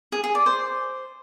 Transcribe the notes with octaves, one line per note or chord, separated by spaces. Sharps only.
G#4
G#4
D5
C5